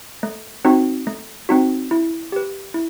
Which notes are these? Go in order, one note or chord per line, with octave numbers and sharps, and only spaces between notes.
A3
C4 D#4 F#4
A3
C4 D#4 F#4
E4
G4 B4
E4